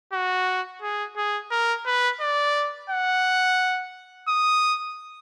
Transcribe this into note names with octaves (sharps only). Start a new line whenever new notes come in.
F#4
G#4
G#4
A#4
B4
D5
F#5
D#6